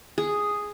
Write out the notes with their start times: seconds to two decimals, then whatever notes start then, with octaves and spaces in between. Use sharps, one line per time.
0.18 G#4